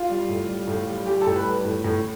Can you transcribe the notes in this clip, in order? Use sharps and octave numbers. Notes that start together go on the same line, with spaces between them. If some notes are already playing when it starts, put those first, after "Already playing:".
Already playing: F4 F5
G3
A2
G3
A2
G3
G3 G4 G5
A4 A5
A2
B4 B5
G3
A2
A2